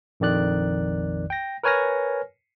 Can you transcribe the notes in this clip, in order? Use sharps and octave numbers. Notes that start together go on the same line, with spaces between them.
A#1 F2 D#3 D5 F#6
G5 A#6
A#4 B4 C#5 G#5 F6 A#6